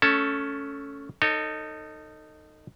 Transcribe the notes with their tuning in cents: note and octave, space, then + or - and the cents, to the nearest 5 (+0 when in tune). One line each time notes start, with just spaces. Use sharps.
A3 +0 C#4 +10 A4 +0
D#4 -10 A4 +25 C#5 -10